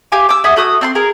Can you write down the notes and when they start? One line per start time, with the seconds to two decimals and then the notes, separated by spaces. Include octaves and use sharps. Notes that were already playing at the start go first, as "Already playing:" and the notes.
0.12 G4 F5 G#5 D6
0.29 D6 E6
0.44 G#4 E5 F#5 D#6
0.56 A3 F#4 D#6
0.81 C4 A5 C6
0.95 G#4 A#4